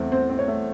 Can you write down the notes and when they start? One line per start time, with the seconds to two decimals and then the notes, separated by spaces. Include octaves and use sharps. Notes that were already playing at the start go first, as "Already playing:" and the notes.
Already playing: E2 A3 C4
0.12 C4 C5
0.30 C4
0.39 C#5
0.48 A3